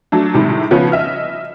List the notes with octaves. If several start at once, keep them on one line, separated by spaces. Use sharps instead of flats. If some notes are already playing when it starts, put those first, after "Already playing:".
F#3 A3 D4
A2 C3 D#3 G3 G#3
C#3 F3 B3 C#4
D#5 E5 F6